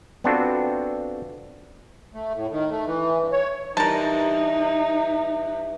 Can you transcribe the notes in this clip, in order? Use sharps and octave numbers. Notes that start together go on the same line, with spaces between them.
B3 C4 D4 F4 F#4 A4
A3
A2
D#3
A3
E3
G2
C#5
G2 E3 D#4 A#4 A5